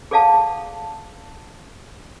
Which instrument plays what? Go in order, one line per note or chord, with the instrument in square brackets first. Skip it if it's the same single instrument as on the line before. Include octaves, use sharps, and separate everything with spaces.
[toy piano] G#4 A4 D5 F5 F#5 A5